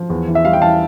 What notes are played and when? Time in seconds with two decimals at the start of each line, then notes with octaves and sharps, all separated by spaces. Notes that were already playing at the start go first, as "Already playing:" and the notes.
Already playing: F3
0.10 E2
0.28 E3
0.35 E5
0.45 G3 F5
0.53 G5
0.62 E3 F5 A5